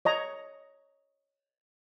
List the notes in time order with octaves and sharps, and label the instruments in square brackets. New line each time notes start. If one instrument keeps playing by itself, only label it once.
[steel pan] C#5 D#5 A#5